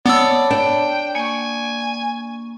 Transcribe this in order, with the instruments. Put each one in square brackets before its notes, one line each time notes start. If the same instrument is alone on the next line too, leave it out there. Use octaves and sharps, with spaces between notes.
[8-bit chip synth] B3 E6 [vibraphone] C#5 A5 B5 [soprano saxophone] D5
[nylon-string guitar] D4 [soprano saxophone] G5
[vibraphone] A#3 C#6 [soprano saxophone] G#5